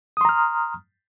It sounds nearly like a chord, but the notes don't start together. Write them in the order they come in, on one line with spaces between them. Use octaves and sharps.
D#6 C6 A#5 F6